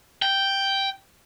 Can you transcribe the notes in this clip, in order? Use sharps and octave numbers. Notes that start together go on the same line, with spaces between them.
G5